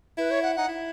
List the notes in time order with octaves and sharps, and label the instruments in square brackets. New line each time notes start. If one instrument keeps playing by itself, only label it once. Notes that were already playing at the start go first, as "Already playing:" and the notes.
[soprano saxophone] E4 [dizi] B4
[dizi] C#5
F#5
[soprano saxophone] D#4 [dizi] F#5
[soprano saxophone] E4